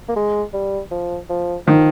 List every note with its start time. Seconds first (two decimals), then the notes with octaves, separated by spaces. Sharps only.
0.09 A#3
0.16 G#3
0.54 G3
0.91 F3
1.30 F3
1.67 D#3 F3